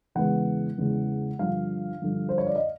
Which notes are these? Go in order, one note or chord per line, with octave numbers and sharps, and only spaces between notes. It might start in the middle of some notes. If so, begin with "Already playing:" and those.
E2 C#3 E3 G#3 B3 F#5
E2 C#3 E3 G#3 B3
G2 D3 F3 F5
G2 D3 F3
C5
C#5
D5
D#5